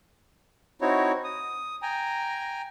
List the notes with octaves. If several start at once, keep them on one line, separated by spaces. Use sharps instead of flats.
C4 D#4 E4 F#4 C#5
D#6
G5 G#5 A#5